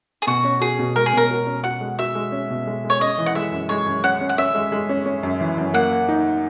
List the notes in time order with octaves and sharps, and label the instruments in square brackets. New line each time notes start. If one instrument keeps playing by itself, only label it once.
[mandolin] G#4
[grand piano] B2 [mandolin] F#4
[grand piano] C#4
[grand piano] F#4 [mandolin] G#4
[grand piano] B2
[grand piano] G#3 [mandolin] A#4
[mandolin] G#4
[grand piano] B2 [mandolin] A#4
[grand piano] F#4
C#4
[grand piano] F#4 [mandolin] F#5
[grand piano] G#3
[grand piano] F#4 [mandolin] E5
[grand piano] G#3
C#4
B2
G#3
G#3
[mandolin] C#5
[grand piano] C#4 [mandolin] D#5
[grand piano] E3
[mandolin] F#5
[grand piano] G#3 [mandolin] E5
[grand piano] F#2
[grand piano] G#3 [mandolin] C#5
[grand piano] F#2
[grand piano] C#4 [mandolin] F#5
[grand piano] C#4
[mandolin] F#5
[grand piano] C#4 [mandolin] E5
[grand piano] G#3
G#3
C#4
C#4
F#2
E3
F#2
[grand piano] A#3 [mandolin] F#5
[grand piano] A#3
D#4